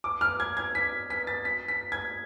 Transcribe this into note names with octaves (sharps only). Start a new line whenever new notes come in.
D6
F6
G#6
G#6
B6
B6
A6
B6
B6
G#6